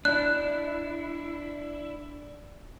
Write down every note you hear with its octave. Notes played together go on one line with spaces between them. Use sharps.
D4 E4 F#6